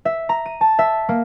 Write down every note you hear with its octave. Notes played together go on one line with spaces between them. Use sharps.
E5
A#5
D#7
A5
E5
A#3